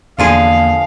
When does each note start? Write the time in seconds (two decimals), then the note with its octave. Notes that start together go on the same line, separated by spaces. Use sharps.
0.19 E2 D3 F3 A#3 G#4 F5